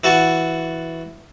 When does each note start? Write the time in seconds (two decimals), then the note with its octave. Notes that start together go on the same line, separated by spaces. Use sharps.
0.04 E3 F#4 A5 C#6